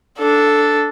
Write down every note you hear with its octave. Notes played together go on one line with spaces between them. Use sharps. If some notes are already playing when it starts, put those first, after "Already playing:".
D4 A4